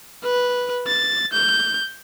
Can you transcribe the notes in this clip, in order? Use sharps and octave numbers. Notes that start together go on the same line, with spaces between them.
B4
A6
G6